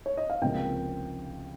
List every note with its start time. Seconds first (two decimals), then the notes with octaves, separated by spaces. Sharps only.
0.06 C#5
0.17 D#5
0.30 F5
0.42 C#2 C3 F3 A#3 G5